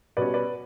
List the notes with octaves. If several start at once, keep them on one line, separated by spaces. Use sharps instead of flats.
B2 G3 C#4 B4 D5
B4 D5